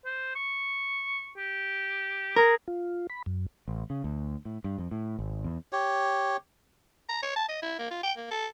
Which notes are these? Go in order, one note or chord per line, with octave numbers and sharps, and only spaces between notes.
C5
C#6
G4
G#4 A#4
F4
B5
F#2
A1
C#3
D2
A2
G2
F2
A2
G#1
E2
G4 C#5
A#5
C#5
A5
D#5
E4
A#3
F4
G5
A#3
A4